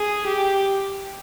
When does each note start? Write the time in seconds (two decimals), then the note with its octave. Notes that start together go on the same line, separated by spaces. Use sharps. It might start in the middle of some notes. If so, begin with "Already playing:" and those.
Already playing: G#4
0.27 G4